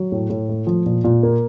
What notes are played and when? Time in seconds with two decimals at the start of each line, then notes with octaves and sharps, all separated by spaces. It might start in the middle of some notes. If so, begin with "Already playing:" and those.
Already playing: F#3
0.12 A2
0.30 A2
0.49 A3
0.67 F3
0.86 A#2
1.04 A#2
1.23 A#3